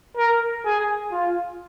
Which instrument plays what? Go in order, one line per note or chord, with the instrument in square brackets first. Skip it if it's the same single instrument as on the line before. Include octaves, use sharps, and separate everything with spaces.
[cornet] A#4
G#4
F4